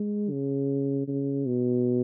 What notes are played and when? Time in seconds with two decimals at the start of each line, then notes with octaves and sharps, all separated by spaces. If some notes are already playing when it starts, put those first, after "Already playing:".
Already playing: G#3
0.31 C#3
1.07 C#3
1.47 B2